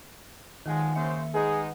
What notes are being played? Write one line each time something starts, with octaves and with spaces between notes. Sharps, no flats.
B1 D#3 F3 G#3 D#4 F#5 G#5
C#3 A#3 C5 E5 C#7
G#3 D#4 G#4 B4 F#5